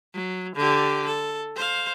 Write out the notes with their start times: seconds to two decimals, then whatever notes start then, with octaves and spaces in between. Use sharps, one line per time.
0.14 F#3
0.55 D3 G4
1.06 A4
1.56 C5 F5